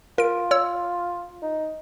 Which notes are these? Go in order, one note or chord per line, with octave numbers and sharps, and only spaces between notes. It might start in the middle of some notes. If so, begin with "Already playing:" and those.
F4 A#4 D7
C#5 E6
D#4